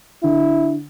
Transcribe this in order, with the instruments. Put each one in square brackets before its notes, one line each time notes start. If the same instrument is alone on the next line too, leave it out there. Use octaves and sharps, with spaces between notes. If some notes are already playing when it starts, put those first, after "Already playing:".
[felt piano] D3 [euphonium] E4